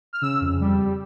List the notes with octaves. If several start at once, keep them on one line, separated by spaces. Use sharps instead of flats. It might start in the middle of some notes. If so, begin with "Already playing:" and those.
F6
C#3 E6
F2
G3